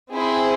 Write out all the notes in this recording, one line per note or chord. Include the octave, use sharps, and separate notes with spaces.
C4 E4 G#4 C5